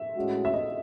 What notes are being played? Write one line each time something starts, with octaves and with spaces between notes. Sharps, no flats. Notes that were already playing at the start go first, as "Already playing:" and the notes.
Already playing: E5
A2 G#3 C#4 F#4
E5
D#5